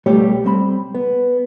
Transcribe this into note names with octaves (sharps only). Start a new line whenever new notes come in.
B1 G3 A3 B3 G4 C#5
G3 C4 B5
B3